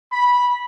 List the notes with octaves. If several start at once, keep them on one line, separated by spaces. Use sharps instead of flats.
B5